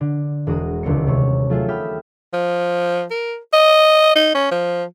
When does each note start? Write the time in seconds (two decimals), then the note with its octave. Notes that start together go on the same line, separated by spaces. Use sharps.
0.01 D3
0.47 E1 G#3 F#4 A#5 D#6 D#7
0.83 D#1 C#2 D3 C4 C#7
1.07 C3 G#3 C#5 C#6
1.50 F#3 A3 F4 G#4 A4 E5
1.68 G4 E5 G5 B5 D#6 F6
2.33 F3
3.11 A#4
3.53 D#5
4.15 D#4
4.35 C#4
4.51 F3